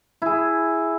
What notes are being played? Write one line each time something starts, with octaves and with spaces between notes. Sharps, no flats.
E4 G#4